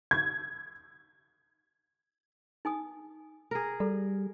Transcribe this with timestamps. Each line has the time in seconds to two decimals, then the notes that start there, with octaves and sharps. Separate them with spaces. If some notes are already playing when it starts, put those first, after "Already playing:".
0.11 G#6
2.65 D#4 G#5 D#6
3.51 G#4 A#4
3.80 G3 A4